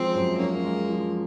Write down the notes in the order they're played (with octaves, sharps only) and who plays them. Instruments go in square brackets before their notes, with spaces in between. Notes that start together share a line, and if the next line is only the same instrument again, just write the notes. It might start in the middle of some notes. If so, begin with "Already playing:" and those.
Already playing: [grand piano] F3 G#3 [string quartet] C4
[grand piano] F#2
[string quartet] A#3 [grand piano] C#4
[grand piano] G#3
F3